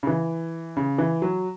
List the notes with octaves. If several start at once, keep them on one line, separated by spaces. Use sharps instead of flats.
C#3
E3
C#3
E3
F#3